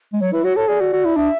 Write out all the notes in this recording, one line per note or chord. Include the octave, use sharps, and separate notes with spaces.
G#3
F#3 C#5
E4 B4
F#4 C#5
A4 C#5
G#4 D5
F#4
F#4
E4
D4 E5